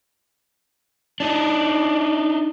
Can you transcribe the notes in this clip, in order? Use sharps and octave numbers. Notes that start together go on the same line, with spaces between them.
D4 D#4